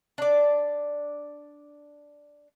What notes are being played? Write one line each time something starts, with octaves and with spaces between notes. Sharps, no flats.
D4 D5